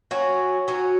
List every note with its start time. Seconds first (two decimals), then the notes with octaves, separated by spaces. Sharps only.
0.11 F#3 C#4 F#4
0.68 F#3 C#4 F#4